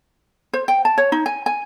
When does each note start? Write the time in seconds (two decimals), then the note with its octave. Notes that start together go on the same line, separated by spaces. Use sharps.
0.53 C5
0.68 G5
0.85 A5
0.98 C#5
1.12 D#4
1.26 G#5
1.46 G#5